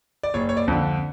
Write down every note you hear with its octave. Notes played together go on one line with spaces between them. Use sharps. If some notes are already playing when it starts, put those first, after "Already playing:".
D5
F#1 C#5
C#5
D5
F2 D3